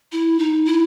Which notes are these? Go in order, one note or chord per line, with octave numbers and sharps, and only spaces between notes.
E4
D#4
E4